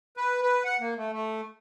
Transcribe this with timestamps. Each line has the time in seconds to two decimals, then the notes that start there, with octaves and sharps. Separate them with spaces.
0.17 B4
0.42 B4
0.65 F#5
0.80 A#3
0.98 A3
1.13 A3